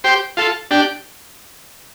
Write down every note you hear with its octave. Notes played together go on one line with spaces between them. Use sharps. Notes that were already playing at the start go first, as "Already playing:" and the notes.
G4 C5
F4 A4
D4 G4